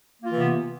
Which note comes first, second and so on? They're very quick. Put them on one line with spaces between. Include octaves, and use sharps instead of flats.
A#3 F4 E3 C3 B3